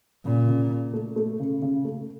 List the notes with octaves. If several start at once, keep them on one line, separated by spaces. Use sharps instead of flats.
A#2 C#3
C#3
C#3
A3
A3
C#3
C#3
A3